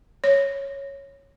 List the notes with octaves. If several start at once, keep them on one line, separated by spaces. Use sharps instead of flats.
C#5